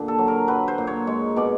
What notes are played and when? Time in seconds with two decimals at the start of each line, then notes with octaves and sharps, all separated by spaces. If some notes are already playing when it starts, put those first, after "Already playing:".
Already playing: A#2 D3
0.08 A4
0.18 F#3
0.28 A#4
0.48 F#3 B4
0.68 C5
0.78 A#2
0.87 C#5
1.07 G#3 C#5
1.36 B2 D5